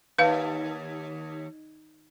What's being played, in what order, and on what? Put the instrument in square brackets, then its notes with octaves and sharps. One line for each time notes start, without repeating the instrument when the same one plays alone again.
[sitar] D#2 [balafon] B4 F5